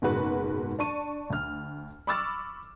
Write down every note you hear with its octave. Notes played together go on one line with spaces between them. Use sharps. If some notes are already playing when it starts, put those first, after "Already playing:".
F#1 G#2 B2 G#3 F#4 B4
D4 A5 C#6 D#7
D2 F6
B5 C#6 D6 E6 F6 A6